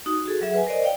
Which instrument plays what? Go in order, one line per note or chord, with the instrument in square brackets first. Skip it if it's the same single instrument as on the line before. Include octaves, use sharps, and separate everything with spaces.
[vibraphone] D#4 F#4 D#6
F#4 G#4 A4
F#3 G#4 E5 F#5
B4 G#5
A#4 C5 D5 D#5
C#5 D5 F5 G5